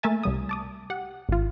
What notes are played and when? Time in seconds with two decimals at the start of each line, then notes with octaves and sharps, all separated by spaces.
0.03 A3 A#3 A#4 E5 G#5 A6
0.23 C2 G3 D#6
0.49 A5 D6 D#6
0.90 G4 F#5
1.29 G#1 F4